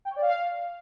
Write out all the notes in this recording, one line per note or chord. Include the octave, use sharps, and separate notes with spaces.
G5
C#5
D5
F5